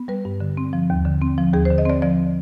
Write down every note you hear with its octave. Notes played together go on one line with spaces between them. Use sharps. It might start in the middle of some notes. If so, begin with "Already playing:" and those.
Already playing: B3
G3 B4
G2
D3
C4
F3
D#2
D3
C4
F3
D#2 G#4
C5
D3
D#5
C4 D5
F3 D5